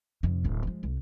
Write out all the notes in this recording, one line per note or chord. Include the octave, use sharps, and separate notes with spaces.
F1 F2
D1 D4
F3 G#3
C2